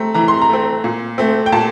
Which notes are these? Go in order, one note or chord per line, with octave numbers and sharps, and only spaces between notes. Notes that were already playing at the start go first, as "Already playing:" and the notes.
Already playing: A3 C4 A#5
E3 A#5
C6
A#5
A3 C4
A#2
A3 C4
G5
A#2 A5